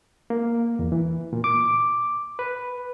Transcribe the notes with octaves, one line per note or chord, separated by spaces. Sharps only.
A#3
E2
E3
A#2
D6
B4